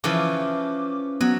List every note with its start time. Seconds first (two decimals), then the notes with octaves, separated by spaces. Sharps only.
0.04 C#3 E3 F3 D6
1.21 F#3 B3